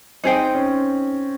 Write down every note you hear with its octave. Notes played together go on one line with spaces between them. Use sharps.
C4 D#4 G#4 C5 G5
C#4